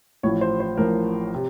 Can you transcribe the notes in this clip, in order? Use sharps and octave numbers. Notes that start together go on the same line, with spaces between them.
A1 A2 F3 C#5
C5
C5
A1 A2 F3 A#4
C3